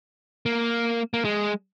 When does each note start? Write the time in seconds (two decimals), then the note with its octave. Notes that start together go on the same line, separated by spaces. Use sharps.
0.46 A#3
1.14 A#3
1.25 G#3